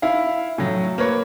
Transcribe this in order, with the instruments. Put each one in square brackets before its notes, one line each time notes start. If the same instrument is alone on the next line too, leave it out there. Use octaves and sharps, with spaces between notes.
[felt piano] E4 F5
A2 F#3
A#3 B4 C#5